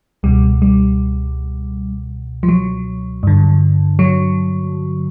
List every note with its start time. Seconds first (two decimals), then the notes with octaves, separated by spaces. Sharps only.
0.23 C#2 B2 G3
0.62 G3
2.43 F3
2.49 F#3
3.23 G2 D3
3.99 F#3